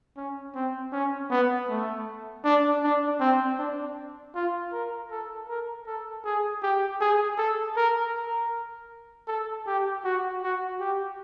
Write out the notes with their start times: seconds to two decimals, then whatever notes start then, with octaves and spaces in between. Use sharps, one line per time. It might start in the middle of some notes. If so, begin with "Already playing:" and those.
0.17 C#4
0.55 C4
0.92 C#4
1.30 B3
1.69 A3
2.44 D4
2.83 D4
3.20 C4
3.59 D4
4.35 F4
4.73 A#4
5.11 A4
5.48 A#4
5.86 A4
6.25 G#4
6.62 G4
7.01 G#4
7.38 A4
7.76 A#4
8.14 A#4
9.27 A4
9.67 G4
10.04 F#4
10.42 F#4
10.80 G4